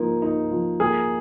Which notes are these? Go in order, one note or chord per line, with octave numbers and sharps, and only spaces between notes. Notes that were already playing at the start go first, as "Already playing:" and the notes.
Already playing: F3 A#3 D#4
D#4
F3
A#3 G#4